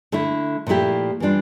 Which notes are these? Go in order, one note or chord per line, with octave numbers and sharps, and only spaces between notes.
D3 A3 E4
A#2 F3 A3 E4 G4
E3 G3 D4 F4